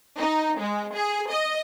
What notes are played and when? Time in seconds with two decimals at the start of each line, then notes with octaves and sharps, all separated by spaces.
0.16 D#4
0.58 G#3
0.92 G#4
1.29 D#5